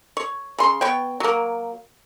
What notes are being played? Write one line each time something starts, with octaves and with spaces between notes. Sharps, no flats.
C#5
C#3 C6
B3 C#5 G5
F#3 A#3